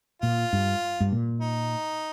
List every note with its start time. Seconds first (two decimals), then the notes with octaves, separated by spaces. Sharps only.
0.22 A#2 F4
0.53 G2
1.01 G2
1.12 A#2
1.41 D#4